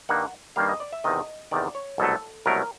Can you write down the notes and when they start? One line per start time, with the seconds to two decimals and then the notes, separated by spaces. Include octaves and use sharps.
0.09 G2 D#3 G3 A#3 F#5
0.56 G2 D#3 G3 A#3 F5
0.69 D#5
0.80 D5
0.92 E5
1.04 E2 C3 D#3 D#5
1.51 E2 C3 D#3 D5
1.75 C#5
1.98 C2 B2 F#3 A3 A4
2.46 C2 B2 F#3 A3 A#4